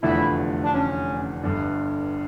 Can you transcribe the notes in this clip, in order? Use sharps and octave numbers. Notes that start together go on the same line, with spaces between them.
F1 E2 D3 F3 A3 E4
D4
C#4
G1 G2 D3